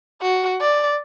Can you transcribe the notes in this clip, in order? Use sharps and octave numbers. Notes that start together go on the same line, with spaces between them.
F#4
D5